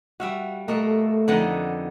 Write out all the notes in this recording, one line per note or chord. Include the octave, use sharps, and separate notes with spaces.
G3 F#4 E5 F5
B2 A3 A#3 A4
F2 D3 B3 D#4 D#5